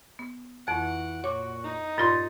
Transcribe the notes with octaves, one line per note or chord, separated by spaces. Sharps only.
B3
F2 E3 F#4 F#5 D7
A#2 F#4 C#5 D6
D#4
G2 A#2 F4 C6 A6